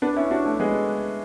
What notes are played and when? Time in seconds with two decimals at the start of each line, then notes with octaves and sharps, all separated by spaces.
0.02 B3 D4
0.16 C#4 E4
0.31 D4 F#4
0.45 A3
0.60 G#3 B3